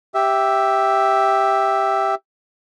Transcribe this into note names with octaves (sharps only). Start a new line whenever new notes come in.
G4 E5